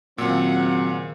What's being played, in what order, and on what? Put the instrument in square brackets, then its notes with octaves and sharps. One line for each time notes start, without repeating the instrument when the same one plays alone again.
[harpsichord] D#2 C#3 E5 [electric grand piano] A#2 [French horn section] F#3 C4 [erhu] F#5